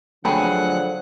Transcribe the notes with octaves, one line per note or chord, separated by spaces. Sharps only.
D3 F3 F#3 A3 G#4 B4 F#5 G5